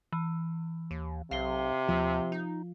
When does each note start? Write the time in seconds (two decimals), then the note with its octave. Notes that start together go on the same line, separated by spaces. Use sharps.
0.12 E3
0.91 D#2
1.31 B1 C3 F5 C7 G7
1.88 D#2 F3
2.32 D#4